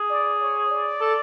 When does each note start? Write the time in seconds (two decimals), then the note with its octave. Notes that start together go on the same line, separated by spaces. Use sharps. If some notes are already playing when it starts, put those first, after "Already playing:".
Already playing: G#4
0.10 D5
0.41 C#5
0.71 D5
1.01 A4